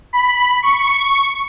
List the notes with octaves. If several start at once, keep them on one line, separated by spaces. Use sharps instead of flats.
B5
C#6